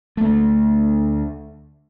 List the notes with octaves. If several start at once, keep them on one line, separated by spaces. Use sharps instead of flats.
D2 A3